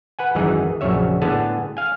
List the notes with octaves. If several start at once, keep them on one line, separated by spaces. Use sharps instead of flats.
B4 F#5 G#5
G#1 F#2 E3 G#3 D#4 G#4
A#1 F#2 C#3 C#5 E5
A2 D3 B3 G#4 G#5 A5
F5 G#5